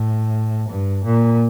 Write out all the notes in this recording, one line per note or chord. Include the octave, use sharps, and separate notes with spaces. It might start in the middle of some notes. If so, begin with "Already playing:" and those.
Already playing: A2
G2
A#2